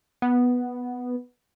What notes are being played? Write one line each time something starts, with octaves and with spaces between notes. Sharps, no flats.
B3